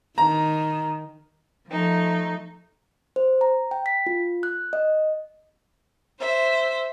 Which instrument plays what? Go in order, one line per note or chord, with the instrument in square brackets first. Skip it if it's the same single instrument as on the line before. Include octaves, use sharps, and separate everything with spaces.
[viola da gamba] D#3 [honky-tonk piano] A#5
[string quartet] F3 A3 D#4
[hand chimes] C5
A#5
G5
B6
F4
F#6
D#5
[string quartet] C5 E5